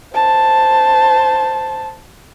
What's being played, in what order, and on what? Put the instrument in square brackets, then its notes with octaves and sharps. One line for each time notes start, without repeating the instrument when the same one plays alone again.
[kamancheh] C5 A5